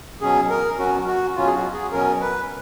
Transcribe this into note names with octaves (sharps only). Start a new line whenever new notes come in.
B2 F#3 C#4 G#4
A#4
B2 F#3 C#4 F#4
F#4
B2 F#3 C#4 F4
G#4
F#4
G#4
B2 F#3 C#4 A#4
B4